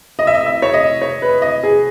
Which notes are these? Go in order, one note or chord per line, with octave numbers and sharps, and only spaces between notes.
D#5
E5
D#5
E5
C#5
D#5
C#5
B4
D#5
G#4